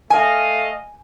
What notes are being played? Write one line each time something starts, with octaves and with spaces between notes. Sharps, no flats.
A3 D#5 F5 G#5